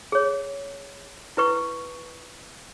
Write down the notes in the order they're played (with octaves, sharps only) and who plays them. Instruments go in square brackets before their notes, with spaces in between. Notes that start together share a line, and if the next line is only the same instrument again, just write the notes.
[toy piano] G#4 C#5
E4 B4 C#6